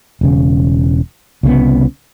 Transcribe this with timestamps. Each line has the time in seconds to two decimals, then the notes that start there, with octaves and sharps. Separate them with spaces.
0.21 E1 C#3
1.43 C2 C#3 G3 B3